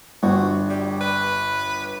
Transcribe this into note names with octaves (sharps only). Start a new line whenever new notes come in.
G1 F#4
G3
B4